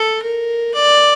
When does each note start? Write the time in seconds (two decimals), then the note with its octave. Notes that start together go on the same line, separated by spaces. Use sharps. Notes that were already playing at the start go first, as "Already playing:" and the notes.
Already playing: A4
0.22 A#4
0.74 D5